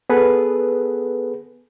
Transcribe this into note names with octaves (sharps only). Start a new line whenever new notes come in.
B3 G#4 A4 B4